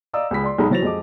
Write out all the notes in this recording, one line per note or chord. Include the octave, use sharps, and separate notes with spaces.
D5 D#5 F5 A#5 D#6 E6
C#2 G#4 B5 B6
D5 C6
B1 G#3 D#4 A#5 B5
E3 F#3 C5 A6 A#6 F7
F2 G#3 D#5 D6